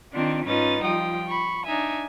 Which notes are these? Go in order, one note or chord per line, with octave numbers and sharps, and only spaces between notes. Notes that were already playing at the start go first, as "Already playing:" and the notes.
D#3 C4 D4 F4
G#2 C#4 D#4 F4 B4 A6
F3 G3 F4 G5 D#6
B5 C#6
D4 D#4 E5 G#5